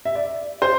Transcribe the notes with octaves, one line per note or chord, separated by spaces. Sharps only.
E5
D5
C5